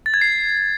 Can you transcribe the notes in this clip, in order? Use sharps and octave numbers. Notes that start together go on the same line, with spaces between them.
A6
G#6
C7